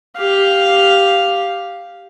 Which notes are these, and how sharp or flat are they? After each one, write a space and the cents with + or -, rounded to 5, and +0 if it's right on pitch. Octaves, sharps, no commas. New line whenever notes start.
G4 +0 F5 +0